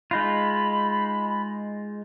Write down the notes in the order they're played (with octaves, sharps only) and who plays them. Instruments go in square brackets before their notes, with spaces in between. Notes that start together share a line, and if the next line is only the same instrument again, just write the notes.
[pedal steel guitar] G#3 D#4 F4 [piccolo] B5